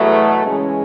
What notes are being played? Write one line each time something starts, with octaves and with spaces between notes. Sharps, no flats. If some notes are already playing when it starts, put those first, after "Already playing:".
Already playing: E2 B2 F#3 A3
C#3 E3 G#3 C#4